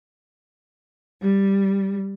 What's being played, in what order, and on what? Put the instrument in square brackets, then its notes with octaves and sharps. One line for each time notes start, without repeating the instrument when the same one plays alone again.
[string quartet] G3